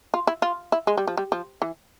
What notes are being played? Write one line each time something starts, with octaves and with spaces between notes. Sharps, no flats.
F4
E4
F4
E4
G#3
G3
F3
G3
F3
E3